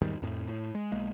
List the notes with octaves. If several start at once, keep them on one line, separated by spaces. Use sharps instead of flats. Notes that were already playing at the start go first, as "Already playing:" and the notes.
E2 G#2 D#3 G3
F2 A2
A2
G#3
B1 G#3 A#3